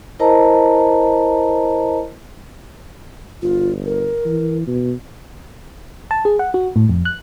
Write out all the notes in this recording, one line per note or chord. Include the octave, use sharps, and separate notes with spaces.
E4 A#4 C5 D#5 A5 A#5
G1 F4
A#4
E3
B2
A5
G#4
F#5
F#4
A2
F2
F#6